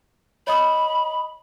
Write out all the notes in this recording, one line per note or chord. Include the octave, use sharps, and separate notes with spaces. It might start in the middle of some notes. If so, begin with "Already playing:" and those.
C#5 D#5 B5 D#6